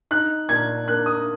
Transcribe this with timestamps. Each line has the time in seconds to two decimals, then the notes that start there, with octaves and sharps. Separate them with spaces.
0.11 D#4 F#6
0.49 A#2 G#6
0.88 A#3 F#6
1.06 D#6